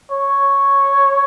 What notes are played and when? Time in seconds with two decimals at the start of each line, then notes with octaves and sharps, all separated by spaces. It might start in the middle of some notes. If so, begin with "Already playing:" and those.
0.11 C#5